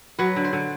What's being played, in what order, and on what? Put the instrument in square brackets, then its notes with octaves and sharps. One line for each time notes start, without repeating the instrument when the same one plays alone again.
[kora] F#3 B4
D3
C5
D3